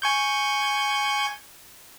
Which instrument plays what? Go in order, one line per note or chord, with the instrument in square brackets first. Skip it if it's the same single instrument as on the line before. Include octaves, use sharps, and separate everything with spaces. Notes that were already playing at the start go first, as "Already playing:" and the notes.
[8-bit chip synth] G#5 C#6 G6